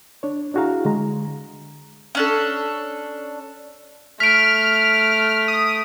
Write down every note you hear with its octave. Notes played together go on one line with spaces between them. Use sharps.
D4 C#5
D4 E4 F#4 G#4 F5 A#5
D3 G#3 A#5
C#4 D4 A4
A3 F6 B6 D7
D#6